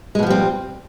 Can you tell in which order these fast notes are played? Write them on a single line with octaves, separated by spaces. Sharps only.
G#3 B2 F3 G3 C4